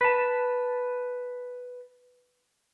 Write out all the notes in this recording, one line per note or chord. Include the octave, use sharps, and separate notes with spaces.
B4 A5